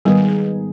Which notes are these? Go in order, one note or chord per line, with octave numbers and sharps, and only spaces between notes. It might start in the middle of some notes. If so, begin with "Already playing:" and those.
G#2 D#3 G3 B3 D#4 G#4